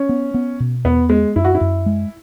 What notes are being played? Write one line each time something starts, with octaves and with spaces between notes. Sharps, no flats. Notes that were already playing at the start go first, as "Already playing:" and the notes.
Already playing: C#4
B3
B3
B2
E2 B3
G#3 B3
F#2 E4
F#4
E4
F#2
G#3